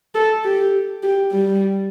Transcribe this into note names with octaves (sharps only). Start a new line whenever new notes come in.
A4
G4
G4
G3